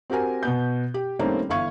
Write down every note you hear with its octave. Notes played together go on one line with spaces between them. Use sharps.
C4 F#4 G4 A#4 G#5
B2 B3 G6
G4
D#3 G3 A3 A#3 C4 C#4
G1 E3 E4 F5 C#6 G#6